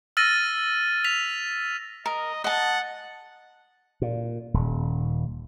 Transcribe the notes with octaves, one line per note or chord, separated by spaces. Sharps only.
E6 F6 A6 A#6 D#7
B6 F7
A#4 D#5
D#5 F#5 A5
A#2
D#1